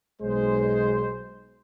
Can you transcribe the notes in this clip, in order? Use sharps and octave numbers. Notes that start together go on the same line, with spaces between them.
B1 G#3 C5